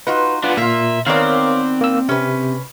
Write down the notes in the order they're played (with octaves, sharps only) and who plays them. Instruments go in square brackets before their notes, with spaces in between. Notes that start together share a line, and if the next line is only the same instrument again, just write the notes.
[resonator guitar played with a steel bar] D#4 F4 F#4 [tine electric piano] B4
[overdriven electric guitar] B3 D4 [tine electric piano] F4 B4 F#5
[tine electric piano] A#2 [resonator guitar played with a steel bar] A#3 F4 [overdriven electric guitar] E5
[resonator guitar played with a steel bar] D#3 B3 D5 [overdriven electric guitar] C4 [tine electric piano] A#4 C#5 F5
[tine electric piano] A#3 E6
[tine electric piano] C3 [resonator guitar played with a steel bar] C#4 B4